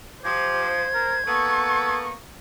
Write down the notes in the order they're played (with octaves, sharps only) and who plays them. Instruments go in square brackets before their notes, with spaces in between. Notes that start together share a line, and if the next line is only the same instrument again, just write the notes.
[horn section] F3 [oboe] G4 [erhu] C5 [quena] G#6
[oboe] A#4
[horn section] A#3 B3 [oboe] A4 [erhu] C#6